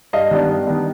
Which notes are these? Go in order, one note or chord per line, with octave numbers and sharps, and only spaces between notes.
G2 D#5 F5
D#3 G3 B3 D4
G2
D#3 G3 B3 D4